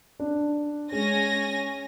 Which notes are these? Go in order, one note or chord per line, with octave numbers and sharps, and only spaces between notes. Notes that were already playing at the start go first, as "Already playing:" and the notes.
D4
G#3 C#4 G#5 A#6